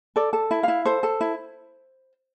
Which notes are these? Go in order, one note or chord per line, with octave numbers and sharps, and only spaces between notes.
A4 D5
A4
E4
E4 F5
A4 C5
A4
E4